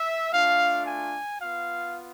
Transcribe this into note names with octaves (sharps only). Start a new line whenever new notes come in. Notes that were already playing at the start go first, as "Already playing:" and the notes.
Already playing: E5
A3 D4 F4 F5
G#5
B3 F4 F5